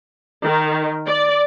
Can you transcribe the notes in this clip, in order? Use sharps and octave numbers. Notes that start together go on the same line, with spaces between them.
D#3
D5